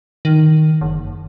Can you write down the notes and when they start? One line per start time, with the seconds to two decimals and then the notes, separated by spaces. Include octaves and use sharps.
0.25 D#3
0.81 F#1